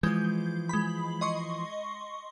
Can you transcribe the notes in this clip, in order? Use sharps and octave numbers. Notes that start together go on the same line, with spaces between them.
E3 F3 G#3 G6
G#3 B5
D#5 C6 C#6